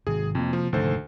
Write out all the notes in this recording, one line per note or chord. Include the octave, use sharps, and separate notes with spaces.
G#1 C3 G#4
F2 C3 A#3
F3
F1 D2 G#2 D#3 A4 C5